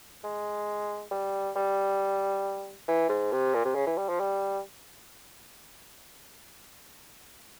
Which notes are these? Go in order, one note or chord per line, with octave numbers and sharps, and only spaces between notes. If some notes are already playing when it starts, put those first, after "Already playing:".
G#3
G3
G3
E3
G#2
C3
A#2
C3
C#3
E3
G3
F3
G3